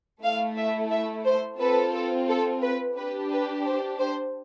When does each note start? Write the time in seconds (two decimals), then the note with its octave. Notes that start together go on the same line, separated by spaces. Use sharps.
0.22 A3 E4 A4 F5
0.57 E5
0.91 E5
1.25 C5
1.60 C4 F4 A4 B4
1.94 A4
2.28 A4
2.62 B4
2.97 D4 G4 B4
3.31 B4
3.66 C5
3.99 C5